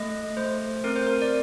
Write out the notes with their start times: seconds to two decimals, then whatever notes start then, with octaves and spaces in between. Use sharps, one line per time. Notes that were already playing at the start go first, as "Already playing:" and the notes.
Already playing: A3 D#5
0.37 A3 C5
0.84 C4 A#4
0.96 C5
1.07 A#4
1.22 D5